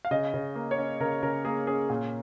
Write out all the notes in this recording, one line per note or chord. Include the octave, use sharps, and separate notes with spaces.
F5
C#3 D#5
C#3
A#3
C#5
C#4
C#3 A#4
C#3 A#4
A#3 G#4
C#4 G#4
A#2